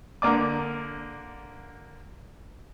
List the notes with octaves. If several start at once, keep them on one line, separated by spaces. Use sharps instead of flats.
D3 A#3 D5 D6